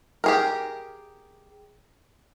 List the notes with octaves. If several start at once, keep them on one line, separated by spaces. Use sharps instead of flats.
G4 G#4 A#4